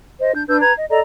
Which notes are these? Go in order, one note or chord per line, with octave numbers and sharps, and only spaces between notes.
C5 D#5
D4 G6
D4 B4 E6 G6
B4 A#5 G#6
D#5
A4 D5 D#5 A#5